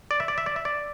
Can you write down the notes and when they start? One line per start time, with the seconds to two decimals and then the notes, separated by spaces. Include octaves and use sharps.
0.11 D5
0.20 E5
0.28 D5
0.38 E5
0.46 D5
0.56 E5
0.65 D5